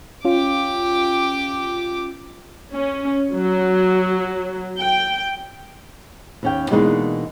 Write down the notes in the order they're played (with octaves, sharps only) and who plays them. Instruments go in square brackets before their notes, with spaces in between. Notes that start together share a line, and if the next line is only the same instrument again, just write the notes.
[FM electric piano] C#4 F4 [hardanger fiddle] G4 D6
[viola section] C#4
F#3
G5
[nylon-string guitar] D#2 C#4 G5
B2 E3 G#3 A#3 D4 D#4